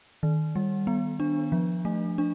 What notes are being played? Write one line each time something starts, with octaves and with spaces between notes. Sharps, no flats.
D#3
G3
B3
D4
F3
A3
D4